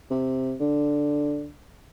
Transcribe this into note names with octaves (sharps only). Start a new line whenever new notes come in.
C3
D3